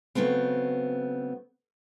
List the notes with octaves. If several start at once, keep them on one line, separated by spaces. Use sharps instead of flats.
C#3 F#3 A3 B3 C4